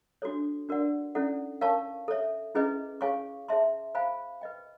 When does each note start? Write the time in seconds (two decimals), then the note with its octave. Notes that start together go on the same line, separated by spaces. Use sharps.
0.22 D4 F#4 A4 C#5
0.69 D4 F#4 A#4 D5 F#5
1.15 C#4 E4 A4 D5 F#5
1.61 A#4 C#5 F5 A5 C#6
2.08 A4 C#5 E5
2.55 C#4 E4 G#4 B4 D#5
3.01 G#4 C#5 F5 G#5 C#6
3.48 G#4 C#5 E5 A5 C6
3.95 C5 F5 G#5 B5
4.41 B4 D#5 G5